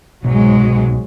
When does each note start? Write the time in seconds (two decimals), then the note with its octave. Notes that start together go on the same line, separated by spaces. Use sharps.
0.24 C2 G#2 B2 F#3 G#3 B3